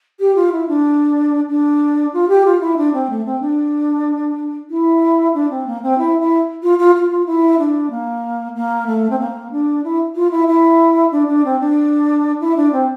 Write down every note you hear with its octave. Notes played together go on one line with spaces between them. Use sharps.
G4
F4
E4
D4
D4
F4
G4
F4
E4
D4
C4
A3
C4
D4
E4
D4
C4
A#3
C4
E4
E4
F4
F4
F4
F4
E4
D4
A#3
A#3
A3
C4
A#3
D4
E4
F4
E4
E4
D4
D4
C4
D4
E4
D4
C4